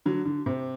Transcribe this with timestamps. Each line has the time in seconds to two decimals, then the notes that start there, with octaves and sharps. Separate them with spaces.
0.06 D3 F#3
0.25 D3
0.46 C3